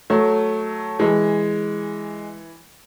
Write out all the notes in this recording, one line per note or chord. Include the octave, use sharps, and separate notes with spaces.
F#3 A3
E3 G#3